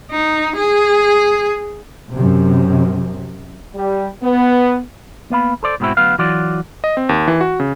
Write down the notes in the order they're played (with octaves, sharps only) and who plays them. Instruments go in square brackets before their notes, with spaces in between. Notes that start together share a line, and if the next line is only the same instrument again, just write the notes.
[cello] D#4
G#4
[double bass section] F#2 C3
[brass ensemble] G3
B3
[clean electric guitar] A#3 B3 F5 B5
A4 C5 D5
G#2 B2 B3 C4 E4 F#4
D2 F#3 B3 F5
E3 F#3 F4 F#4 D5
[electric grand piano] D#5
C4
D#2
E3
F#4
C#3